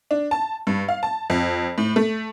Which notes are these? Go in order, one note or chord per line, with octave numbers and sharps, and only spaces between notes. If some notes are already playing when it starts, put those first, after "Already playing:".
D4
A5
G2
F5
A5
F2
A2
A3